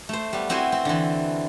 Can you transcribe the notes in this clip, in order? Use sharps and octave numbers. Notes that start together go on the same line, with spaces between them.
A3 C5
G3 B3
B3 C4 E4 F#4 C5 G#5
C4
D3 E3